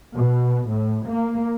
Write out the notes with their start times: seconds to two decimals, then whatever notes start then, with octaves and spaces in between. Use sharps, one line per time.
0.14 B2
0.68 A2
1.07 A#3